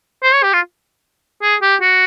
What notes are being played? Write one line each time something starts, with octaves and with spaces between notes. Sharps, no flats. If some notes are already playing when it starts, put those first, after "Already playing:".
C5
C#5
G4
F4
G#4
G4
F#4